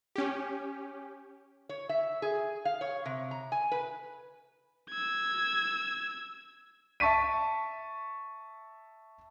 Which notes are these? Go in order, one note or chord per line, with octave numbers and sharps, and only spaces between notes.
C#4 G4
C#5
E5
G#4
F5
C#5
C3
A#5
G#5
B4
E6 G#6
E5 A5 C#6 B6 D#7